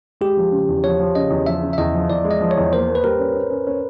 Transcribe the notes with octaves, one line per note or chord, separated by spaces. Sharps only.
G#3 G4
F3
C#3
E2
F3 C#5
F3
C#3 D#5
E2
F3 E5
C#3
E5
E2 D#5
F3
E2 D5
G#3
D#5
F3
C#5
E2
A#3 C5
A#3
B4
G3 A#4
C#4
C#4
C#4
C#4